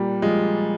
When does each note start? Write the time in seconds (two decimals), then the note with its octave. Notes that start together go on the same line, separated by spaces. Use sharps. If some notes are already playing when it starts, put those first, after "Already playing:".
Already playing: A#2 G3
0.22 F3 G#3